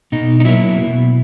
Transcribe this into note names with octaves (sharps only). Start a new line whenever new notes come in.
B2 D#4
D#4
F#3 A#3 E4
B2